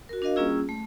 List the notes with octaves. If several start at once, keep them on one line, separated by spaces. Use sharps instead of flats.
F#4 A#4
D4 F#4 A#4 D#5 F5
G3 A#3 C#4 F4 G#4 E6
A3